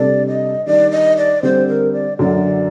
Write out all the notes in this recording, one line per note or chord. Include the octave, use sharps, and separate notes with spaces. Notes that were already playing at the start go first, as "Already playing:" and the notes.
Already playing: C3 G3 D4 A4 D5
D#5
D#3 G3 D4 D5
D#5
D5
D3 G3 C4 C5
A#4
D5
F#2 D3 F#3 D5